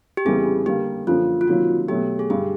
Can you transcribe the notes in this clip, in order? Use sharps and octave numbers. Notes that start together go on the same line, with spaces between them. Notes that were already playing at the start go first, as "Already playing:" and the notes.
G4
F2 C#3 E3 G3 B3 G#4
D3 G3 A#3 G4
F#2 D3 F3 A#3 F4
F4
C3 D#3 F#3 A#3 F#4
B2 F#3 A3 G4
G#4
G2 D3 G3 G4